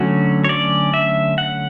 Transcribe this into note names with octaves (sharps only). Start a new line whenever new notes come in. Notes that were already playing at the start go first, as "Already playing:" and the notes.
Already playing: D3 F#3 A3 C#4 F#4
C#5
D5
E5
F#5